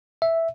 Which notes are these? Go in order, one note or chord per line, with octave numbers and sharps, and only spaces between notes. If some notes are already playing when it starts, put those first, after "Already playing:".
E5